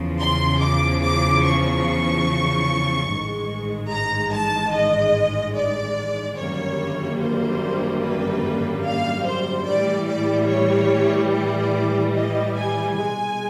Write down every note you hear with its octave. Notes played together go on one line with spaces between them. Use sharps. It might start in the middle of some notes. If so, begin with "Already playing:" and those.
Already playing: E2 C#3 F3
C6
D6
D6
C#6
A1 G#2 D#3 G#3
A#5
A5
D#5
D5
G#1 F#2 D3 G3 A#3 C#5
C5
B4
F5
C5
A2 E3 G3 D5
D5
C#5
D5
D#5
G#5
C2 B2 G#3 G#5